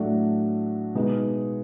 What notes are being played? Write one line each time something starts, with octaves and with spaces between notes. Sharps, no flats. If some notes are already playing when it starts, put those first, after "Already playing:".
Already playing: A2 F#3 A3 D4 F#4
B2 G#3 B3 D#4